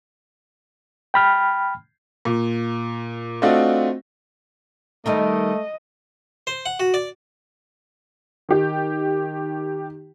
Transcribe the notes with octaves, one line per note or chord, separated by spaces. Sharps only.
G5 B5 F6
A#2
A3 C4 D4 F4 F#4 D#5
D#3 G3 A3 D#4 D#5
C5
F#5
F#4
D5
D#3 G4